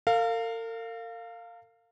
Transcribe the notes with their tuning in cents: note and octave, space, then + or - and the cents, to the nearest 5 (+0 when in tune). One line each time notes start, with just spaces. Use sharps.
A#4 -45 F5 +0